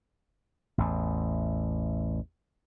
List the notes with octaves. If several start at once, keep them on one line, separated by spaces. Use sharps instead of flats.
A1 E2